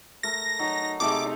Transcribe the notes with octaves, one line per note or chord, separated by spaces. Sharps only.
A3 A#4 A#6
F#3 D#4
C3 A3 D#4 G#4 D6